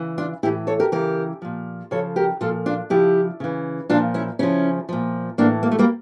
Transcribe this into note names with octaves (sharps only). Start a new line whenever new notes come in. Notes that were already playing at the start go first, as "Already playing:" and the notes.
Already playing: C#3 E3
D4 F4
A2 E3 E4 G4
A4 C#5
G4 A#4
C#3 E3 G4 A#4
A#2 F3
C#3 F3 A4 C#5
G4 A#4
A#2 F3 F4 A4
D4 F4
C#3 F3 E4 G4
C#3 E3
A#2 F3 D4 F4
C#4 E4
C#3 F3 C#4 E4
A#2 F3
A2 E3 A#3 D4
A#3
A3
G3 A#3